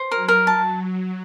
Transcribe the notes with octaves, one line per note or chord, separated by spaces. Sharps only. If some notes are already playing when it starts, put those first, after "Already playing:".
Already playing: C5
F#3 A#4
A#4
A5